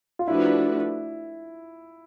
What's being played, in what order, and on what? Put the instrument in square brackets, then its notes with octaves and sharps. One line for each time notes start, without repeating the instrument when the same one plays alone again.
[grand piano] F4
[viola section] F3 A3 D4 F#4 B4 [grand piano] E4